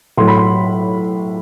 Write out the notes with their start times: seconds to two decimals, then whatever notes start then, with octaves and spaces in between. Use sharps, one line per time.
0.17 A2 F#3 A3 C6
0.28 B5
0.38 C6